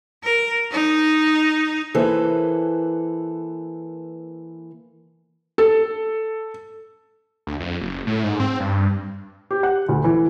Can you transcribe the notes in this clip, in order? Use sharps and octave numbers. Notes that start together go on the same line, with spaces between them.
A#4
D#4
E3 A#3 A4 B4 C5
A4
D2
F2
F#1
A2
G#2
C4
G2
G4
F#5
D2
E3